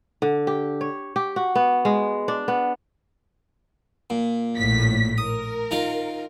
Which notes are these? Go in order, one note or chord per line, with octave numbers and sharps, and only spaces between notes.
D3
G4
C#5
G4
F#4
B3
G#3
D4
B3
A#2
A#1 A2 B6
A#4 D#6
D#3 F4 F5